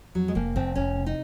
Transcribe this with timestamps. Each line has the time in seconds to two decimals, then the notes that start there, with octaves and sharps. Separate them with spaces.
0.15 F2 F#3
0.28 G#3
0.35 F1 A#3
0.55 F1 C4
0.75 F1 C#4
0.96 C3
1.06 D#4